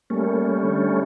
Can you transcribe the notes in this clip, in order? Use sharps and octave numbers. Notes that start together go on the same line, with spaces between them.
G3 A3 A#3 C#4
D3